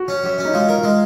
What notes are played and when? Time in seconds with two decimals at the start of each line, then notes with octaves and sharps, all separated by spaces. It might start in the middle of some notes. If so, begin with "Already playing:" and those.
Already playing: F#4
0.08 C#4
0.24 F#2
0.38 C#4
0.45 D#4
0.54 G#3 F4
0.69 A#4
0.83 G#3